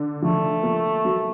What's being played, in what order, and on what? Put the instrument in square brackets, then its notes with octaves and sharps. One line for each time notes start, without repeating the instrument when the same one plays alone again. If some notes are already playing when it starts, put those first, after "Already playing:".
Already playing: [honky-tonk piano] D3
[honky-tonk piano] F3 [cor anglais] A3
[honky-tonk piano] A#3
F#3